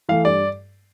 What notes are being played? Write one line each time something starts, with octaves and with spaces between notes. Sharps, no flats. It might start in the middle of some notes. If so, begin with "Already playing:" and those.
E3 A3 F5
G2 D5